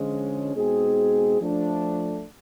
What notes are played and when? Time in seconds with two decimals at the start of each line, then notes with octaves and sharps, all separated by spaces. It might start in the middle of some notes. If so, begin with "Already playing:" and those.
Already playing: D3 F3 G#3 C#4
0.54 B2 G#3 C4 D#4 G#4
1.39 F3 A3 D4